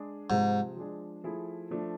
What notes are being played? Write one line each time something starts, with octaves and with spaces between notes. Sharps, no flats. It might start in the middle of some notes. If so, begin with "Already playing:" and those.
Already playing: G#3 D4 G#4
G#2 C3 F3 G#3
F3 G#3 D4 G#4
F3 A3 E4 G#4
F3 A3 D4